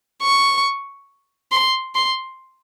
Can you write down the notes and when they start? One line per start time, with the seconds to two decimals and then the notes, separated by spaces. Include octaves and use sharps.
0.22 C#6
1.51 C6
1.95 C6